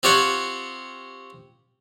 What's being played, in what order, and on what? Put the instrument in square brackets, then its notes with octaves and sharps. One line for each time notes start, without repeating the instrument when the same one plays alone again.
[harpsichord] C4 F4 G4 C#5 F#5